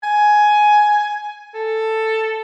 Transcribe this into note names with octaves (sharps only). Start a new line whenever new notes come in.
G#5
A4